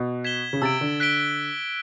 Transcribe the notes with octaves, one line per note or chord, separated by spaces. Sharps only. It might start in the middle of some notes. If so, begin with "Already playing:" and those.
Already playing: B2
G#6 B6 E7 G7
C#3
C3 E6 A6 D7
D3
F#6 B6 D7 G7